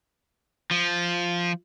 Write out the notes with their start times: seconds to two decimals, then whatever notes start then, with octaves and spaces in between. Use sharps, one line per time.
0.71 F3